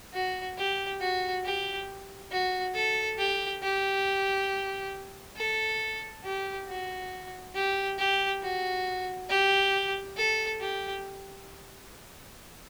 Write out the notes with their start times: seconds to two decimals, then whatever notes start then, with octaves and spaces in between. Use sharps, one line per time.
0.13 F#4
0.57 G4
1.00 F#4
1.44 G4
2.31 F#4
2.74 A4
3.18 G4
3.62 G4
5.36 A4
6.24 G4
6.67 F#4
7.55 G4
7.98 G4
8.42 F#4
9.29 G4
10.17 A4
10.60 G4